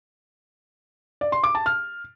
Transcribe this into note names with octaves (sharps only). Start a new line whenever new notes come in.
D5
C6
D6
A5
F6